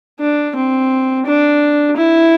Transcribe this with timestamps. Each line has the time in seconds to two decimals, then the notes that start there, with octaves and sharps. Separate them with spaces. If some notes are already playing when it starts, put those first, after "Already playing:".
0.20 D4
0.56 C4
1.26 D4
1.96 E4